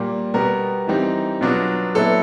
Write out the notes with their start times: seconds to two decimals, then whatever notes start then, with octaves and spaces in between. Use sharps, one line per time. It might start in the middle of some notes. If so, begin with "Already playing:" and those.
Already playing: A#2 G3 A#3
0.34 B2 G3 B3 A#4
0.87 E3 G3 C4 D#4
1.41 B2 F#3 B3 D4 F4
1.95 A#2 F#3 B3 E4 A4